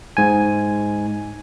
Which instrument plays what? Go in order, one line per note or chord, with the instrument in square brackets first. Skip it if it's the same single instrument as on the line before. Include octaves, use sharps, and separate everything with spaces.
[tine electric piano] G#2 G#5